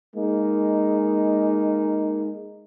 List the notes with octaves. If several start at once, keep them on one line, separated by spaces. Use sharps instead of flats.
G#3 A#3 D#4